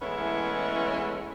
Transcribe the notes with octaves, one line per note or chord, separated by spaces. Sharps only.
E3 G#3 A3 B3 C#4 E4